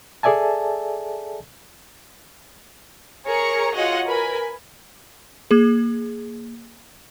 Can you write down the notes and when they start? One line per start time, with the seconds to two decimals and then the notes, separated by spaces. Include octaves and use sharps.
0.23 G#4 A4 D5 E5 G#5 A5
3.26 G#4 A#4 C#5 A#5 C#7
3.74 F4 F#4 G#4 C#5 D#5 F#5
4.05 A#4 B4 G#5 B5
5.51 A#3 G#4